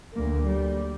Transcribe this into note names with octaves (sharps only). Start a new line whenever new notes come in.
D2 A#3
G3